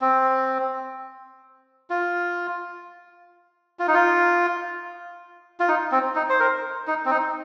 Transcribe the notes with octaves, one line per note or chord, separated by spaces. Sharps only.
C4
F4
F4
D#4
F4
F4
D#4
C4
D#4
C5
A#4
D#4
C4
D#4